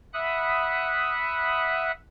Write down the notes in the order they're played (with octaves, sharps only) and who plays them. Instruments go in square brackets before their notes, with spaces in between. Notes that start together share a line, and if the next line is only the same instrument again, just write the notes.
[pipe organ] E5 F#5 B5 D#6 F#6